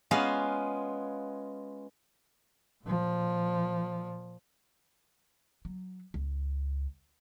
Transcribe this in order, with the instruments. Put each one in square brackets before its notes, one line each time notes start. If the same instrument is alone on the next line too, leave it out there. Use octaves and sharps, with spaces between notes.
[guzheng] G#3 B3 C#4 F4 F5
[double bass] A#2 F3
[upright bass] F#3
C#2